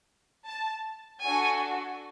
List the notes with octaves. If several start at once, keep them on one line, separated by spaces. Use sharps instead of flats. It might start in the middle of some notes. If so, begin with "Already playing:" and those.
A5
D4 F#4 A4 G#5